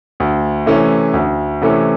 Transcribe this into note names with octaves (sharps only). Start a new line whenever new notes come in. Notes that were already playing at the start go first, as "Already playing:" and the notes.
D2
C3 E3 A3 C#4
D2
C3 E3 A3 C#4